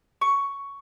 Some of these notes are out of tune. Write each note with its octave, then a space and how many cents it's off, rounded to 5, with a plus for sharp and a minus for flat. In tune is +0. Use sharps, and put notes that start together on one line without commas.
C#6 +10